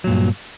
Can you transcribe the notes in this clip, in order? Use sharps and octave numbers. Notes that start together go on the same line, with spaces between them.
G2 A#2 F#3